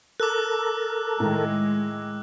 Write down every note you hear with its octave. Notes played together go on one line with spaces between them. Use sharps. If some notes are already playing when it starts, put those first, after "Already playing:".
A4 A#4 D6 E6 F#6
A2 D#3 G#3